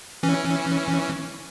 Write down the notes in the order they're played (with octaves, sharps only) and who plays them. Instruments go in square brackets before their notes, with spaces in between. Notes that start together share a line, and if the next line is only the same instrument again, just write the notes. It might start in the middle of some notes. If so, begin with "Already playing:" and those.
[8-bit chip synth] E3 C#4